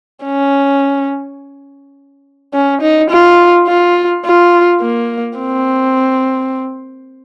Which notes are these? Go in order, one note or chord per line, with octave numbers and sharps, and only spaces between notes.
C#4
C#4
D#4
F4
F4
F4
A#3
C4